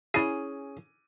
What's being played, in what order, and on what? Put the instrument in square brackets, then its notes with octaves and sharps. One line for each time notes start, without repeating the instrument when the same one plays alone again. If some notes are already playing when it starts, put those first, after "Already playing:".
[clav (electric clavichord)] C#4 G#4 [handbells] E4 C7 [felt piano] D#7